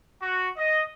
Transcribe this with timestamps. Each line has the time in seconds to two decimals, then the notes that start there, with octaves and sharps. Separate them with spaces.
0.21 F#4
0.58 D#5